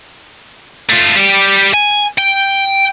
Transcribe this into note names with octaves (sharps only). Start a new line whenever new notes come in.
A3 F4
G3 G4
G#5
G5